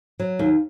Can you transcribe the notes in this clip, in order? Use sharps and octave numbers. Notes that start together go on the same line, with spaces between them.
F#3
D#2